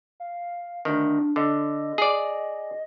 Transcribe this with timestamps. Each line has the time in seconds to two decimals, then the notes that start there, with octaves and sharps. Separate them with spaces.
0.20 F5
0.85 D2 D#3 D4
1.36 D3 D#5
1.98 G#4 D5